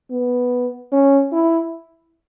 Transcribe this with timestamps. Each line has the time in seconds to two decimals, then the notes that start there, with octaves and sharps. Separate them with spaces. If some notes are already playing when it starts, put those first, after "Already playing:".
0.11 B3
0.92 C#4
1.32 E4